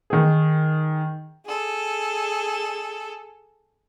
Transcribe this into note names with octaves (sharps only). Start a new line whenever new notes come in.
D#3 G#4
G#4 A4